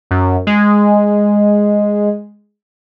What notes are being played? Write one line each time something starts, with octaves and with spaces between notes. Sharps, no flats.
F#2
G#3